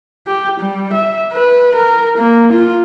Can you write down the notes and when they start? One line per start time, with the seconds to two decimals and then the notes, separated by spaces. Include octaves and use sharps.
0.27 G4
0.60 G3
0.94 E5
1.33 B4
1.76 A#4
2.18 A#3
2.53 F4